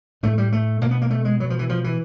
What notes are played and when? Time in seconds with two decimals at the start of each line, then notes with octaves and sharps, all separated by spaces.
0.23 A2 A3
0.38 G3
0.52 A3
0.81 B2 A#3
0.91 B3
1.02 A#3
1.10 A3
1.25 G#3
1.40 B2 F#3
1.50 F3
1.59 E3
1.69 F3
1.84 E3